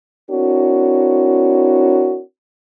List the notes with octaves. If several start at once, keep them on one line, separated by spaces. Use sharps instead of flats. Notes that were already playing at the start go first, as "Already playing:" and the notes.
C4 D4 E4 F#4 A#4 C#5